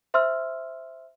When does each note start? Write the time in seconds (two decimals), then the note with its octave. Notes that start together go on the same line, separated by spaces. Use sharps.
0.14 C5 E5 C6 E6 F6